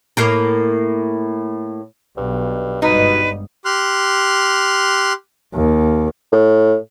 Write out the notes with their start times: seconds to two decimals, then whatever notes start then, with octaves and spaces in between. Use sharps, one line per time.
0.17 A2 A#3 A#4
2.17 B1 G2
2.82 G1 G#2 B2 G3 D#4 B4
3.65 G4 C6 F6 F#6
5.54 D#2
6.32 A2